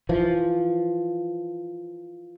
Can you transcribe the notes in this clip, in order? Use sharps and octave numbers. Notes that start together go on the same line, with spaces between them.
E3 F3